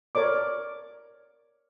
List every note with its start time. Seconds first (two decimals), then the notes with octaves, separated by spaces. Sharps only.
0.15 A#4 C#5 D5 D6